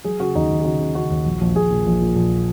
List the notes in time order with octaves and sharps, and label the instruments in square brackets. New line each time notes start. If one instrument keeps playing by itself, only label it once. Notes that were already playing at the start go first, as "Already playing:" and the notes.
[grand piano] F#3 G#4
C#3 F#4
D#2 D#4
D#2
G#4
C#3 F#4
C#3
C#3 F#4
D#2
A#1
A#1
A#1 G#4
A#2
A#1
A#2
A#1